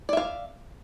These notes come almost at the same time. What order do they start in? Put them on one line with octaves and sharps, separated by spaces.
D5 E5 F5